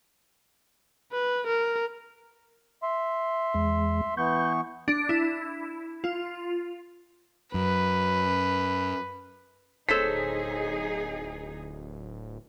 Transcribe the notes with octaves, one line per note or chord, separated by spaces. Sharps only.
B4
A#4
E5 C6
E2 G#3
E3 B3 C#6 G6
D4
E4
F4
F#2 B4
D1 D#4 G#4 A4 C5 C#5 B6